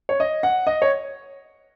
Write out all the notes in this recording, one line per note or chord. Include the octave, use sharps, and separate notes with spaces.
C#5
D#5
F#5
D#5
C#5